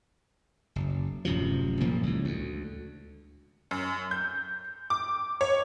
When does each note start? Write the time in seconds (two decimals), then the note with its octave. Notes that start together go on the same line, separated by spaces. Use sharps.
0.76 F#1
1.25 D1 F#2 C3 F3
1.81 F1 A#2 F3 A#3
2.03 C#2 A2
2.25 D2
3.71 F#2
4.11 G6
4.90 D6
5.41 C#5